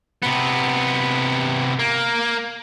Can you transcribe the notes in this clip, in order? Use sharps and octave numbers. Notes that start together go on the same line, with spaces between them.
C3 B3
A#3